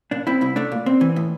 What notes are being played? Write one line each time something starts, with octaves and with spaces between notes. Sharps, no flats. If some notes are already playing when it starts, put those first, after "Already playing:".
A#2 D4
C4 E4
C2 E4
A3 D4
A#2
C4
E3
A2